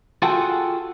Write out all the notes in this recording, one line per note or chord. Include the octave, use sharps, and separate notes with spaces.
F4 F#4 G#4 A4 F#5 G5